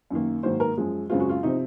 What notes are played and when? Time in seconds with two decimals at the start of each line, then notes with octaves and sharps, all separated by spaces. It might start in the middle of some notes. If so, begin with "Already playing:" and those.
0.10 F#2 D#3 A#3
0.43 G#2 D#3 F#3 A#3 C5
0.60 A#4
0.77 F#2 F3 G#3
1.10 F#2 C#3 G#3 C4 F4
1.20 F#4
1.29 F4
1.43 C3 F3 C4 D#4